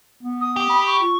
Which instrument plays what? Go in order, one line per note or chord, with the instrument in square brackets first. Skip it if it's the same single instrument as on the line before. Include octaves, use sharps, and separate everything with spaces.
[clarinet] B3
[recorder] D#6
[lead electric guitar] G4
[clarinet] B5
[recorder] C#6
[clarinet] F4